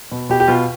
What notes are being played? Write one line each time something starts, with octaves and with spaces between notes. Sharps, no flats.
B2
B2 G4
G4
B2 F4